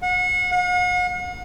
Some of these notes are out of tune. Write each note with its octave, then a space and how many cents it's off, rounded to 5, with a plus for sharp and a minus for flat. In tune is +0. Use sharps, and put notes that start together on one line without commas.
F#5 -35
F#5 -45